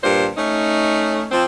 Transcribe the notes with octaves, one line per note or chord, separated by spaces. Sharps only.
G2 A#2 C5
A3 C#4 D#4
F3 C4